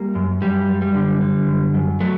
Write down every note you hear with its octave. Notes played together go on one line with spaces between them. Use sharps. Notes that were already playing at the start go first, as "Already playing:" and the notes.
Already playing: G3 A#3
F#2
F#2 G3
F#2
G3
D3
D3
F#2
F#2
F#3 A3